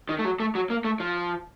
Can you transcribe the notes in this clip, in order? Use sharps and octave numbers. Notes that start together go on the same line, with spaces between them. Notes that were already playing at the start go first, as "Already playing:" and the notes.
D#3
A3
F#3
A3
F#3
A#3
A3
F3